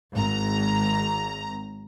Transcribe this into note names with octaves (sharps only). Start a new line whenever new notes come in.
G#1 A#5